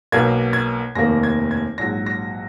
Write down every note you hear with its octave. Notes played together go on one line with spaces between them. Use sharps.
B1 B2 A#3 G#6
G#6
F1 D#2 D#3 A#3 A#6
G#6
G#6
A#1 G#2 F#3 A#6
A#6